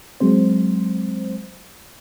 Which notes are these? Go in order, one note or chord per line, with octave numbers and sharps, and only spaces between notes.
F#3 G#3 C4 C5